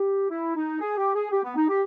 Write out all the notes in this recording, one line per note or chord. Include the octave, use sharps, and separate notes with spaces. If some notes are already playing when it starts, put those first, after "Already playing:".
Already playing: G4
E4
D#4
G#4
G4
G#4
G4
B3
D#4
G4